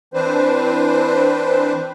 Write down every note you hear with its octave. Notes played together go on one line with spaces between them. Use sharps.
E3 C4 D4 B4 C5